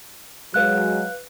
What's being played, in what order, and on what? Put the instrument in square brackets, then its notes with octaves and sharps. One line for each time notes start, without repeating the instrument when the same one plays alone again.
[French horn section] F#3 G#3 [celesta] B4 F5 F#6